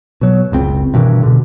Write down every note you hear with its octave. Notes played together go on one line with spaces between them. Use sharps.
B2 F#3
F#1 C#2 C4
G2 B2 D#3 E3
B2 D3